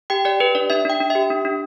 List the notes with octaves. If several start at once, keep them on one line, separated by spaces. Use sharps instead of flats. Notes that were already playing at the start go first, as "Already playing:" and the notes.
G4 G5
G4 D5
G4 B4
D4 D5
D4 E5
D4 G5
D4
E5
G4
D4
D4